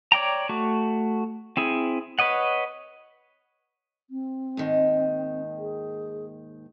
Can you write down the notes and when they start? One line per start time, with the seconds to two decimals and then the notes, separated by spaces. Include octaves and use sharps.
0.12 C#5 D5 G5 A#5
0.49 A3 F#4
1.57 C4 E4 G#4
2.19 B4 C#5 D#5 F#5
4.10 C4
4.57 D#2 G#2 D#3
5.58 G#4